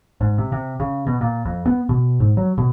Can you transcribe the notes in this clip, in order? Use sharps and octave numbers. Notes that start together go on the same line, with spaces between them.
G#2
C3
C3
C#3
B2
A#2
F2
B3
B2
G#2
F#3
B2